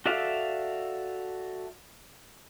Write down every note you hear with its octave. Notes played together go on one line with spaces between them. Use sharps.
F#4 A4 D5 E5 F5